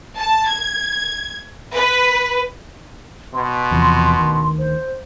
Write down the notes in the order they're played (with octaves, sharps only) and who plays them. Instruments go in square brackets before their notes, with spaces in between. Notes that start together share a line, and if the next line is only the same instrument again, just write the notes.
[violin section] A5
G#6
B4
[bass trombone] B2 [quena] C6
[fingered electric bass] E2 C3 F3
D2 D#3
[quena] C5